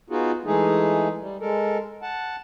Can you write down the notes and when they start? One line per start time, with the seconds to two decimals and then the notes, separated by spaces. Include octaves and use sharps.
0.10 B3 D#4 F4 F#4 G#4
0.45 E3 G#3 A3 D#4 G#4
1.20 G3
1.41 G#3 A4 A#4
2.02 F#5 A5